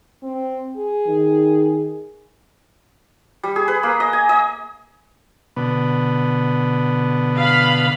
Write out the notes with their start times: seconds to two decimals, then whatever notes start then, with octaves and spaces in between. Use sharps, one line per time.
0.23 C4
0.77 G#4
1.07 D#3
3.43 G3
3.56 G#4
3.68 B4
3.83 A#3
4.00 D#5
4.13 G#5
4.29 D#5
5.56 B2 D3 B3
7.38 F5 B5